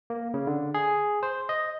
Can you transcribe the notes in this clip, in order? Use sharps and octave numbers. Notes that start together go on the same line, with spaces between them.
A#3
C#3
D3
G#4
C5
D#5